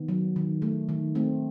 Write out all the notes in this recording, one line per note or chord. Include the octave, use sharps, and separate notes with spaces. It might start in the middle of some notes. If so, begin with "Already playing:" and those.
Already playing: D#3 B3
F#3
D#3
A3
D#3
A3 C4